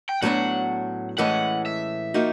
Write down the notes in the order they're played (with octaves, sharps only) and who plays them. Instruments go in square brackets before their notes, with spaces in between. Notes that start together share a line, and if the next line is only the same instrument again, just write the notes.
[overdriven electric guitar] G5
[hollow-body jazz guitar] A2 F#3 B3 D4 [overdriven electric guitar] F#5
[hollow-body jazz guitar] A2 E3 G#3 C#4 [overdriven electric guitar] F#5
[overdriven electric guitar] E5
[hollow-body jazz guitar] F3 A#3 D#4 F#4